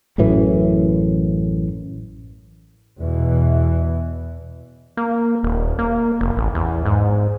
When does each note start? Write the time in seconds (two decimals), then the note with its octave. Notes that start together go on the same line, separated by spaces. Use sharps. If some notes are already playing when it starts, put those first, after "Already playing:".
0.18 A1 F#2 A2 E3
2.98 E2 B2 E3
4.97 A#3
5.43 D#1
5.79 A#3
6.21 F1
6.37 A1
6.55 E2
6.85 G#2